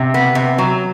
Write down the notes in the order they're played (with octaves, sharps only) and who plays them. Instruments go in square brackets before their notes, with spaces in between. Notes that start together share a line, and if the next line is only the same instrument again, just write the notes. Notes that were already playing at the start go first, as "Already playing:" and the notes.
Already playing: [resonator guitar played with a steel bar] C3
B3
C3
F#3